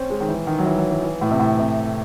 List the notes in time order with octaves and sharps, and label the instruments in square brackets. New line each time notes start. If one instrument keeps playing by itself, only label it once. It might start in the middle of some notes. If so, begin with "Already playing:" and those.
Already playing: [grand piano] C4 C#4
G#3
D#3
E3
D#3
F#3
E3
F#3
E3
E3
A2
C3
A2
C3